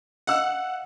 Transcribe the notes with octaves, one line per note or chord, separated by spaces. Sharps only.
D#5 F5 F#5 E6